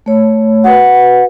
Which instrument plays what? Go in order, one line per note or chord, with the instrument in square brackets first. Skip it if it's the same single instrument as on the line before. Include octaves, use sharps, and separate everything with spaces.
[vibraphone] A3 C#5
[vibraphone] F#4 B4 [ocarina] F#5